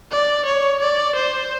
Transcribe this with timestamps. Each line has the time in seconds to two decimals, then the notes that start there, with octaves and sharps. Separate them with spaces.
0.12 D5
0.46 C#5
0.80 D5
1.16 C5